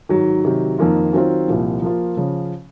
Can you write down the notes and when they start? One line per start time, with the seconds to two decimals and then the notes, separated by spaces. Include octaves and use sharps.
0.09 G#2 D#3 F#3
0.45 C3 D#3 F#3
0.78 F2 D#3 A#3 F4
1.13 D#3 F#3 C4 F4
1.48 C2 A#2 F3
1.82 F3 A#3 F4
2.17 C#3 F3